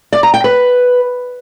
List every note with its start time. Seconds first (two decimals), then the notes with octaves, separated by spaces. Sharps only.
0.13 D5
0.23 A#5
0.34 G5
0.44 B4